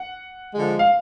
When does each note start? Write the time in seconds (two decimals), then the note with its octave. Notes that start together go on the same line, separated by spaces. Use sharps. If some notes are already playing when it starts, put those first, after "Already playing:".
Already playing: F#5
0.54 D3 F3 G#3
0.79 F5